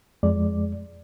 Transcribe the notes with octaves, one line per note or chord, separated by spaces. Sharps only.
F2 G#3 D5